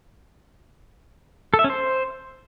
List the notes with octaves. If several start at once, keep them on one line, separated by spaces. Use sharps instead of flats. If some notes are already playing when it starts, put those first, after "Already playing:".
A4
E5
C#4
C5